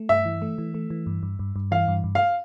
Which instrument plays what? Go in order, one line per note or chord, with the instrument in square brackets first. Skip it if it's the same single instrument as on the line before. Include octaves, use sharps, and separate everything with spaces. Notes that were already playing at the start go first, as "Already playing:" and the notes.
Already playing: [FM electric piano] A3
[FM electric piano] G2 [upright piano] E5
[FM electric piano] E3
A3
E3
A3
E3
G2
G2
G2
G2
[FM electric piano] E3 [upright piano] F5
[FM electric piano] G2
G2
[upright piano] F5